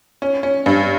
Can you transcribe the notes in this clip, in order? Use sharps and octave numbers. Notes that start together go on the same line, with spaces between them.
C#4
C#4
G2